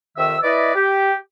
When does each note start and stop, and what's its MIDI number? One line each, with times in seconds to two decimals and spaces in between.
0.17 0.37 41
0.17 0.37 48
0.17 0.37 51
0.17 0.37 76
0.17 0.37 88
0.43 0.73 64
0.43 0.73 71
0.43 0.73 74
0.43 0.73 75
0.75 1.14 67